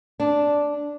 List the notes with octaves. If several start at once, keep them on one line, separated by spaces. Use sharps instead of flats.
D4